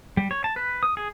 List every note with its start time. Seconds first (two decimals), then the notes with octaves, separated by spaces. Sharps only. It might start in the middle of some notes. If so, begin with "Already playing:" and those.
0.17 G3
0.31 C#5
0.44 A5
0.56 B4
0.83 D#6
0.97 G#4